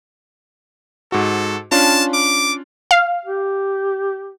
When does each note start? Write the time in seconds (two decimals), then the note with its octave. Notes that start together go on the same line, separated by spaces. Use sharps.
1.12 G#2 F#4 A4
1.72 C#4 D4 F4 A5
2.14 D6
2.91 F5
3.25 G4